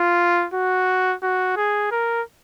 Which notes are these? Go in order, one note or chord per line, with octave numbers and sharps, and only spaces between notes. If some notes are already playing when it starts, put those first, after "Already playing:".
Already playing: F4
F#4
F#4
G#4
A#4